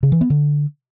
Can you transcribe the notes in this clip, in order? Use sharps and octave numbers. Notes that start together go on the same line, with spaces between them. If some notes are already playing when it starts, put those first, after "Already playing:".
C#3
E3
B3
D3